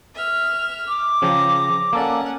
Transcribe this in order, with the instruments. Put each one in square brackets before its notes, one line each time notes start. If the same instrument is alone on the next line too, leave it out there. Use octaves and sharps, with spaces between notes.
[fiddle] E5 F6
[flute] D6
[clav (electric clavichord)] C#3 F3 G5 [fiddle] A#5
[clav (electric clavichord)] A#3 A4 D5 [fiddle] C#4 F#5